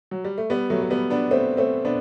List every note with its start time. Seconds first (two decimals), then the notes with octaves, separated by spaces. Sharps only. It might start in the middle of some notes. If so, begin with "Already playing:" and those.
0.11 F#3
0.24 G3
0.38 A3
0.50 G3 B3
0.70 F#3 A3
0.83 A3
0.90 G3 B3
1.10 B3 D4
1.31 A3 C4
1.57 A3 C4
1.85 B3 D4